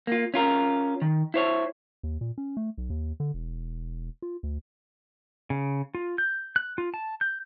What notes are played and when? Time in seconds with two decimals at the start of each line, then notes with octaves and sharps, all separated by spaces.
0.07 A#3 F4
0.34 C#4 F4 A#4
1.02 D#3
1.34 E4 C5 C#5
2.03 D#2
2.21 A#2
2.38 C#4
2.57 A3
2.78 B1
2.90 D#2
3.20 D3
3.34 E1
4.22 F4
4.43 D2
5.50 C#3
5.95 F4
6.18 G6
6.56 F#6
6.78 F4
6.94 A5
7.21 G6